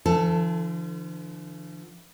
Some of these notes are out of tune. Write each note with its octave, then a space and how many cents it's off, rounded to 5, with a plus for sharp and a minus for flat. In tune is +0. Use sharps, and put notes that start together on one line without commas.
D3 +20 F3 -45 A4 +10